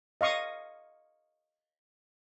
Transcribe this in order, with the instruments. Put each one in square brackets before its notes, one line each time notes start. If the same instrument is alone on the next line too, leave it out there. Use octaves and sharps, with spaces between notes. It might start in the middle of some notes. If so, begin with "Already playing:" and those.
[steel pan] D#5 F5 C#6 D#6